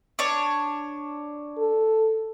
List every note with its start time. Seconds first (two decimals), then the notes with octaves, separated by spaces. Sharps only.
0.19 D4 C#5
1.58 A4